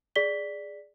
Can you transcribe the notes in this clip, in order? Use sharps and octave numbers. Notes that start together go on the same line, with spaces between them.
G#4 D5 B6 G7